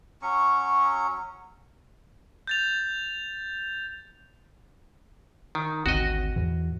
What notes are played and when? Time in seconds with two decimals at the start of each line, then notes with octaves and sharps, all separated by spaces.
0.22 F#3 C#4 C#6
2.47 G6 A6 F7
5.55 D#3
5.86 G#1 D2 C4 F#4 D#5
6.36 E2 G#2 E3